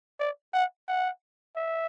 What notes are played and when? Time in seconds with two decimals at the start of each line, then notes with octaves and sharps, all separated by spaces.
0.20 D5
0.54 F#5
0.88 F#5
1.56 E5